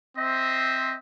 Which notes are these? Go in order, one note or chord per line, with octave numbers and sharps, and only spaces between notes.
C4 C5 D#5 E5